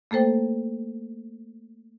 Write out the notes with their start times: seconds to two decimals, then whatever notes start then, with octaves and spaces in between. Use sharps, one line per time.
0.11 A3 A#3 A4 C5 G5